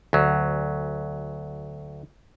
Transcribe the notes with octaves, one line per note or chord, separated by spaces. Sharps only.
D2 F#3